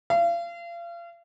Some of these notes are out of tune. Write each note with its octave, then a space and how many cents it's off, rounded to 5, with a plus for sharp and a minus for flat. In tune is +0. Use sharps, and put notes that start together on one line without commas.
F5 -35